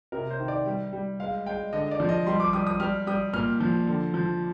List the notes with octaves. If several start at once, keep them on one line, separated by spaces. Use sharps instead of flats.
C3 A#4
C5
D#3
D5
G3
G3
G#3 F5
G#3 G5
D3 D#5
D5
F3
D#5
G3 C6
D6
G3 D#6
D#6
G3 F6
G3 D#6
A#2 F6
F3
D3
F3